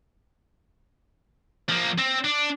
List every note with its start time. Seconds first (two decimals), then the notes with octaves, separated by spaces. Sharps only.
1.69 F3 A#3
1.98 C4
2.25 D4